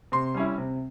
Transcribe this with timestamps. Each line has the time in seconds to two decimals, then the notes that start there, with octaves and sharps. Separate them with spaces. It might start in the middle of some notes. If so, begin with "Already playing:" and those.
0.12 C3 C6
0.34 G3 C#4 E4
0.58 C3